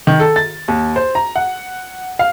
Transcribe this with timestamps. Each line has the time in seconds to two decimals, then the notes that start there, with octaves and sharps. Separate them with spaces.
0.07 D#3
0.20 A4
0.36 A6
0.68 D#2
0.96 C5
1.15 A#5
1.36 F#5
2.19 F5